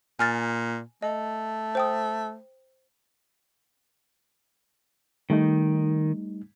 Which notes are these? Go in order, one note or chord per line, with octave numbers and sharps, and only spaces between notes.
A#2 G#5 F6 A6
A3 D#5
C5 G5 D#6
D#3 G3 A3 D#4